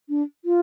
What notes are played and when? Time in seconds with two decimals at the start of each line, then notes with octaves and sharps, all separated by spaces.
0.09 D4
0.45 F4